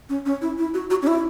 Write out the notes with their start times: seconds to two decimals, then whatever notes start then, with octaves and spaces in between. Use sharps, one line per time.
0.09 C#4
0.26 C#4
0.42 E4
0.58 E4
0.74 F#4
0.90 F#4
1.02 C#4
1.07 E4